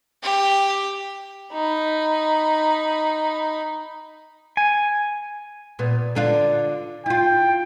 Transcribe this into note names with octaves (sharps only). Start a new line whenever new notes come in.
G4
D#4 B5
G#5
A#2 B3
D3 D4 F4
E4 F4 G5